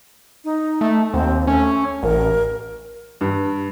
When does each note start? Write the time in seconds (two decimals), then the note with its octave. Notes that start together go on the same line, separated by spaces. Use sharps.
0.44 D#4
0.81 A3
1.14 D#2 C4
1.47 A3 C#4
2.03 A1 A#4
3.21 G2